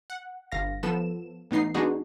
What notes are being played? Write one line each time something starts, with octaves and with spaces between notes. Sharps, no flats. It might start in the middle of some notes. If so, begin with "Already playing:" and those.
F#5
G1 F5 A#6
F3 B3 A4 E7
A1 B3 D#4 C7
G#3 B3 D4 D#4 F#4 G#4